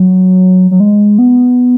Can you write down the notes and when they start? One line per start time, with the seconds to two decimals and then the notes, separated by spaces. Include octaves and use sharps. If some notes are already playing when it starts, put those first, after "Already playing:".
Already playing: F#3
0.71 F#3
0.80 G#3
1.18 B3